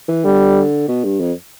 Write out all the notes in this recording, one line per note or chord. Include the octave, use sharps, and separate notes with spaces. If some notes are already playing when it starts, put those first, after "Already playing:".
E3
D3 G3
B2
G2
F2